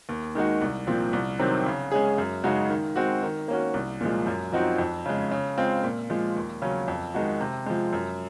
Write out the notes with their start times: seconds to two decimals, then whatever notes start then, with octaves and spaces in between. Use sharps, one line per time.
0.09 D#2
0.35 D#3 G#3 D#4 F#4
0.62 C2
0.87 A#2 F3 C4
1.13 C2
1.39 C3 D#3 F#3 C4
1.66 C#3
1.92 G#3 C#4 G#4
2.18 F#2
2.44 C#3 G#3 D#4 F#4
2.70 D#3
2.96 G#3 C4 F#4
3.23 D#3
3.48 A#3 C#4 F#4
3.74 C2
4.01 A#2 F3 G#3
4.27 F#2
4.52 F3 C4 D#4 F#4
4.78 F2
5.06 C#3 G#3
5.31 C#3
5.57 G#3 C4 F4
5.84 A#2
6.10 F3 G#3
6.36 D#2
6.62 C#3 F#3 C#4
6.88 F2
7.14 D#3 G#3 D#4 F#4
7.41 C3
7.66 F3 G#3
7.93 F#2